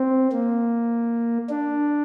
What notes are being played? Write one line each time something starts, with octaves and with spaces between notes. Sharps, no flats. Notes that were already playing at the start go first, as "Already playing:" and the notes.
Already playing: C4
A#3
D4